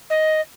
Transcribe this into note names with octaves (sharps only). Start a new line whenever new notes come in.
D#5